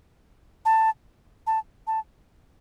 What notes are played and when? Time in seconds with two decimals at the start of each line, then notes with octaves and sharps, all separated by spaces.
0.65 A5
1.47 A5
1.87 A5